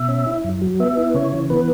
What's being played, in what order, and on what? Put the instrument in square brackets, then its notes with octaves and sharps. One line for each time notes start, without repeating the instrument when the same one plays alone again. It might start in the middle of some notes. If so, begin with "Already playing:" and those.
Already playing: [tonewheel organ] B2 E5
C#4
E4
F#2
F#3
B3 E5
E4
C#3 C#5
E3
B3 B4